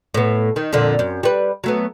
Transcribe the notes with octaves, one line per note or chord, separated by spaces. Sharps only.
A2 B3
D#3
F2 A#2 D3
F#2
G3 B4
F#3 A3 B3